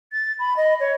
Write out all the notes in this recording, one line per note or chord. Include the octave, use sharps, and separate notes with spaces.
A6
B5
D#5
C#5